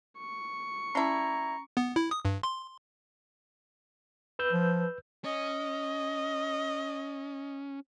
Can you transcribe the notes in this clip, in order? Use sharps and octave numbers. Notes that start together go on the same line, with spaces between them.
C#6
G3 C#4 E4 A5 A#5
B3
E4
D#6
G2
C6
B4 E6 G6
F3
C#4 D#5